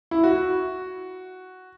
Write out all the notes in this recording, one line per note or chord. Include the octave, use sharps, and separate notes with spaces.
E4
F#4